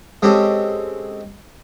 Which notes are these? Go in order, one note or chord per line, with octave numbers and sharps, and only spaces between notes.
G#3 C4 C#4 G4 A4